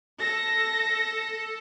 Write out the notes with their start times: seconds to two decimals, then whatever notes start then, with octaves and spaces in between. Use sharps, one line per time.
0.20 A4 A#6